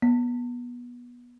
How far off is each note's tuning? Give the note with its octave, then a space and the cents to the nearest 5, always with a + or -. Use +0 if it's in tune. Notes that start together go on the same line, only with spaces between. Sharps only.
B3 -20